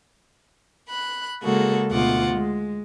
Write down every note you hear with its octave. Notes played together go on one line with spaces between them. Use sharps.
B5 F#6
C#3 G#3 A#3 F#4 A4
D2 B2 F4 F#5 D6
G#3